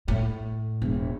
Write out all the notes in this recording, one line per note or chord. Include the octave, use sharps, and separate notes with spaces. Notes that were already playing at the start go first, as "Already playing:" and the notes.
A2
E1